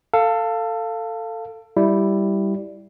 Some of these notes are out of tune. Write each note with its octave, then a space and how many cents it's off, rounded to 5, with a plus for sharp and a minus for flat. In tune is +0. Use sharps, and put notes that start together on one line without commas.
A4 +20 F5 -5
G3 +0 E4 +0